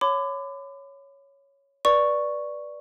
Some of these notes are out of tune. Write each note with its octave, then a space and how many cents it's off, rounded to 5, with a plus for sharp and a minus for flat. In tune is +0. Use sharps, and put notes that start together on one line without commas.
C#5 +0 B5 +40 D6 +15
B4 -25 D5 +0 C#6 +0